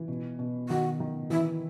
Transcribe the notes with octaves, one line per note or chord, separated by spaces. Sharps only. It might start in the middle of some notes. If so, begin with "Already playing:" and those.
Already playing: E3
B2
B2
D#3 F#4
D#3
E3 E4